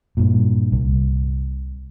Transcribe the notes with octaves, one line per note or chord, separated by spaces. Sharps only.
G2 A#2
C2